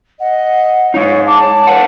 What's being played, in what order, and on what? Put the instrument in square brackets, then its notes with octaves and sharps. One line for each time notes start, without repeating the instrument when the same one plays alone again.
[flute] D#5 [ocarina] F#5
[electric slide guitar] G#3 D#4 [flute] C#5 [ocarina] F5
[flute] A5 [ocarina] D6
[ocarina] C#5
[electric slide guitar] B4 F5 F#5